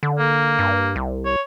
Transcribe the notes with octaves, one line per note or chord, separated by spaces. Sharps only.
D3
A#3
G2
C2
C#5